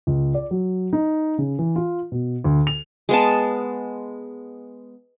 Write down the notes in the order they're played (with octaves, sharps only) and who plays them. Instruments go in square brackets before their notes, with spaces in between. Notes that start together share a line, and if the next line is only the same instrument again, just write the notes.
[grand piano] C#2
D5
F#3
D#4
C#3
E3
F4
B2
D2
F7
[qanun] G#3 B3 A5